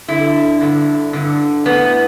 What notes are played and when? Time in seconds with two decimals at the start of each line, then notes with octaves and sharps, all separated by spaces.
0.08 G2 D3 E4
0.61 G2 D3
1.13 G2 D3
1.66 A2 E3 B3